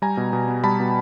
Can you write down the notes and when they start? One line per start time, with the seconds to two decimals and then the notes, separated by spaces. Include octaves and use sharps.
0.02 G3 G#5 A#5
0.17 B2
0.33 B2
0.48 B3
0.64 G3 A5 B5
0.80 B2